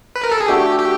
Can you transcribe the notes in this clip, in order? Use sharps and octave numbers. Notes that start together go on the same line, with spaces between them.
B4
A#4
A4
G#4
A3 D4 F#4 G4 A4
G4